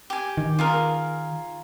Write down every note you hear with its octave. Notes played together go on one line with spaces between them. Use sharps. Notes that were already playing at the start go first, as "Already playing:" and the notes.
G4 G#5
D#3
F4 G#4 A#4